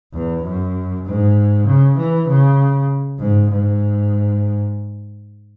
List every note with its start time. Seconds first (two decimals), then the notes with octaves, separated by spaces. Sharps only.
0.13 E2
0.44 F#2
1.05 G#2
1.67 C#3
1.97 E3
2.28 C#3
3.19 G#2
3.50 G#2